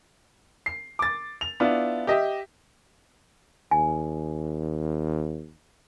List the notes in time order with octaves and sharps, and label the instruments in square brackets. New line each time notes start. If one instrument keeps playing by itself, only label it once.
[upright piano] C7
D6 A6
F7
B3 D4 E4 F4
G4 D#5 E5
[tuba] D#2 [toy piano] G#5